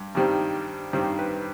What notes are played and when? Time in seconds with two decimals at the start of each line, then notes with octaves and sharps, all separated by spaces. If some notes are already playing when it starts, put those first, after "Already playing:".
Already playing: G2
0.15 G2 D#3 G3 C4
0.93 G2 D#3 G3 C4 C5
1.19 B4